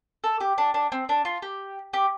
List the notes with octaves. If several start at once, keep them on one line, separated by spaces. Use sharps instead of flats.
A4
G4
D4
D4
C4
D4
F4
G4
G4